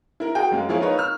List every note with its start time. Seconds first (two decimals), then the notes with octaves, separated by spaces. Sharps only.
0.20 E4 A#4
0.35 F#4 G#4 G5
0.51 F#2 G#3 A#3
0.69 F3 A#3 E4 G#4 C#5
0.80 D#4 F4 A#4 B4 C#5
0.98 E6 F6